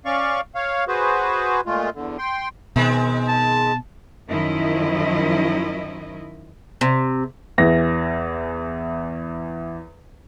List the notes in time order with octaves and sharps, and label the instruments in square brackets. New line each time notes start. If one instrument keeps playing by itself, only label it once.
[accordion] C#4 D5 F5 C#6
C#5 F5
F#4 G#4 B4 C5
A#2 G#3 A3 F4
E2 D3
G5 C6
[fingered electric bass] B2 [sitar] D#3 G#3 C4
[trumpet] A5
[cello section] F#2 D#3 F3 E4 D#5
[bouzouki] C3
[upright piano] E2 E3 A#6